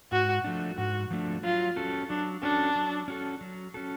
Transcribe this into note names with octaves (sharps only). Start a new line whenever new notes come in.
G#2 F#4
F3 A3 D4
G#2 F#4
F3 A3 D4
F#3 F4
C#4 F#4 A4
F#3 D4
C#4 D4 F#4 A4
F#3
C#4 F#4 A4
F#3
C#4 F#4 A4